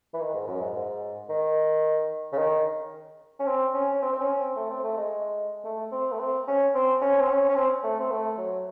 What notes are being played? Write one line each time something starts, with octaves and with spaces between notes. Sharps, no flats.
E3
D#3
G#2
F#2
G#2
G#2
D#3
C#3
D#3
C#4
C4
C#4
C#4
C4
C4
C#4
C4
A3
C4
A3
G#3
A3
C4
A3
C4
C#4
C4
C#4
C4
C#4
C#4
C4
A3
C4
A3
F#3